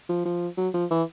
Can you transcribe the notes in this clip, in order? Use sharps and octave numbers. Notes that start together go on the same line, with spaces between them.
F3
F3
F#3
F3
E3